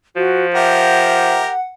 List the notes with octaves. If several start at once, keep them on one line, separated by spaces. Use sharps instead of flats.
F3 F#4
G4 A#4 E5 F#5